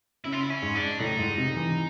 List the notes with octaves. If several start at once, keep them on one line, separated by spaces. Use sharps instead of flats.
C#3 E4
F4
E4
C#4
G#2
D4
A2 D#4
G#2
C3
E3